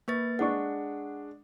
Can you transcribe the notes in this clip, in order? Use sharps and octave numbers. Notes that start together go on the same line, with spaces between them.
A#3 B4 C#6 A6
G#3 D4 F#5 C#6